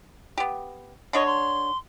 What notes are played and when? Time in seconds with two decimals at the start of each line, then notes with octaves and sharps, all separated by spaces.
0.38 B3 G4
1.13 D3 D4 C#5 D#5
1.26 C6